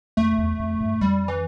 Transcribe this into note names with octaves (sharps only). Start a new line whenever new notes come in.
F2 A3
E2
F2
G2
F2 G3
E3